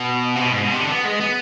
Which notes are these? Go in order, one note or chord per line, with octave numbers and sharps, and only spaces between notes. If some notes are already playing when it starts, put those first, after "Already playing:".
Already playing: B2
C3
B2
G#2
B2
C3
D3
B3
G#3
B3